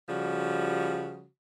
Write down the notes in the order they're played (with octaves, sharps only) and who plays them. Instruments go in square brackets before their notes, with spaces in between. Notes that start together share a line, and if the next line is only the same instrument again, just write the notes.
[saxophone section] C#3 F3 G3 F#4